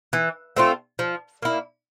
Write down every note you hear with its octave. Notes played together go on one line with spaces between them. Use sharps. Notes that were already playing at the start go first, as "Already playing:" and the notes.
E3
A3 C4 F4
F3
A#3 E4